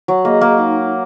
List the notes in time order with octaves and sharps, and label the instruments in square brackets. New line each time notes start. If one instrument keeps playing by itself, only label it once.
[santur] F#3
[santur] A#3 [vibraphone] G#4 D#5
[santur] A#3
[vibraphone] D#4